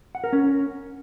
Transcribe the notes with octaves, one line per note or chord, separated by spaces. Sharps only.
F#5
A#4
C#4